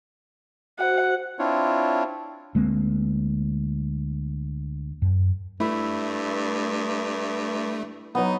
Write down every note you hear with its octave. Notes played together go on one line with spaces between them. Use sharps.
F#4 C5 F#5
C4 D4 E4 F4 C#5
D2 G#3 A#3 C4
F#2
G2 A3 E4 E5
F#3 B3 D#4